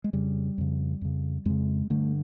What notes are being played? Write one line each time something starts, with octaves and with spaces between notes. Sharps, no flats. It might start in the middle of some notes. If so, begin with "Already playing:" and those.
G#3
F2 C#3 G3
F2 C#3
F2 C#3
F2 C#3 G#3
G2 D3 A3